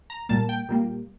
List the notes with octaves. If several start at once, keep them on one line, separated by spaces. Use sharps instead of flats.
A#5
A#2 G3 A#3 A5
G5
A#2 G3 A#3